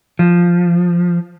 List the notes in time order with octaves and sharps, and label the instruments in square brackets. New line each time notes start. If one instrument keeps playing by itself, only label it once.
[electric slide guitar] F3